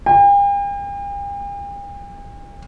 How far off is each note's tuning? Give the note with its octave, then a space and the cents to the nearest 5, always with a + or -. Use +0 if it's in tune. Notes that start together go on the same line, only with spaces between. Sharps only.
G5 +45